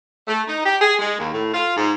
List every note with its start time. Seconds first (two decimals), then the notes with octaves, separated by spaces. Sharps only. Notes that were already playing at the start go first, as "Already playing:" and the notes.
0.28 A3
0.47 D#4
0.64 G4
0.81 G#4
0.99 G#3
1.18 D#2
1.33 A2
1.54 F4
1.76 G#2